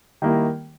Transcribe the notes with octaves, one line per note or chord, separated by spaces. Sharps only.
D#3 G3 A#3 E4